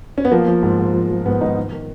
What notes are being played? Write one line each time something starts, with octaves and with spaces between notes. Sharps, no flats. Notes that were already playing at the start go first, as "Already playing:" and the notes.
C#4
B3
F3 A#3
F3
G#2
G#2
F3
F3
G#2 B3
G#2 D#3 D#4
D#3
D#3